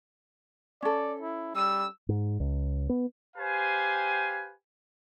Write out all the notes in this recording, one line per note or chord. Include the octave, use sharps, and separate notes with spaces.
C#4 A4 D5
E4
G3 E6
G#2
C#2
B3
G4 B4 C5 F5 G5 G#5